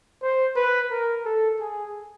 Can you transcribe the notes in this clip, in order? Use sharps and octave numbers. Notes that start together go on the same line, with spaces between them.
C5
B4
A#4
A4
G#4